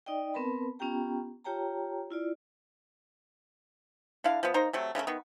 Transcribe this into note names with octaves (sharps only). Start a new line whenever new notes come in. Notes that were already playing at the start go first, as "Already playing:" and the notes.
D#4 D5 D#5 G5
B3 C4 A#4 B4 A5 B5
B3 C#4 F4 G4 G5 A#5
F4 G4 C#5 G5 A5 A#5
E4 F4 D5
D3 D4 E4 F5
F3 B3
A#3 D#4 C5 A#5
C3 F#3 A3
C#3 E3 A3 A#3
D#3 B3